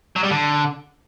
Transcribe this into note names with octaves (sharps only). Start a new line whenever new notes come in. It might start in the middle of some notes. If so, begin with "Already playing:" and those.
F#3
G3
D3